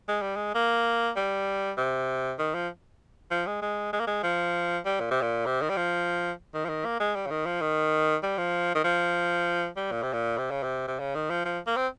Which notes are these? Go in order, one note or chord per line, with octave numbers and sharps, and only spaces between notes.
G#3
G3
G#3
A#3
G3
C3
D#3
F3
F3
G#3
G#3
G#3
A#3
G#3
F3
G3
A#2
C3
A#2
C3
D#3
G3
F3
D#3
F3
D#3
A#3
G#3
G3
C#3
D#3
F3
D#3
G3
F3
D#3
F3
G3
A#2
C3
A#2
C3
C#3
C3
C3
C#3
D#3
F3
F3
A#3
C4